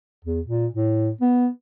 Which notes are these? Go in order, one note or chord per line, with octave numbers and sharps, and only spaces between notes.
E2
A#2
A2
B3